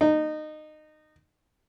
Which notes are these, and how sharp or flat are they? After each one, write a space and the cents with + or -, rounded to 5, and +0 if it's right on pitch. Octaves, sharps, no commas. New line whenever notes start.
D#4 -20